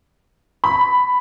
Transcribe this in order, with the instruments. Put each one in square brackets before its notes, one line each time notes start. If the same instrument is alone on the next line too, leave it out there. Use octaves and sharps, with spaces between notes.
[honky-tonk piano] B5